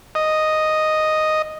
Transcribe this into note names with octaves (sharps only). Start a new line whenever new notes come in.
D#5